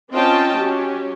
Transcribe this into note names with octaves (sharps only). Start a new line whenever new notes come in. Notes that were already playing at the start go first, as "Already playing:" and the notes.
C4 C#4 F4 D#5 G5 A5
F#3 C#4 G4